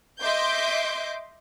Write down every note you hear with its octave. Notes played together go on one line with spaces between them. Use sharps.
D#5 E5 C6 D6 G6